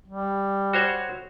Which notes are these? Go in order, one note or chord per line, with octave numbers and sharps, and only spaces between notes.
G3
F#4 C5 C#5